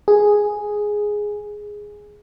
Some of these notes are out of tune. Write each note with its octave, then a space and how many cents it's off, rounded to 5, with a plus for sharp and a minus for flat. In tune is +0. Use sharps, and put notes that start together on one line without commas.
G#4 +0